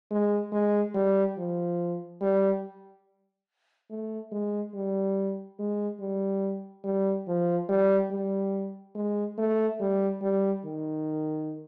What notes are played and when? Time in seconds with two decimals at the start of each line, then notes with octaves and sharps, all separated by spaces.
0.11 G#3
0.52 G#3
0.94 G3
1.38 F3
2.21 G3
3.90 A3
4.32 G#3
4.74 G3
5.59 G#3
6.00 G3
6.84 G3
7.28 F3
7.69 G3
8.11 G3
8.95 G#3
9.38 A3
9.80 G3
10.22 G3
10.65 D#3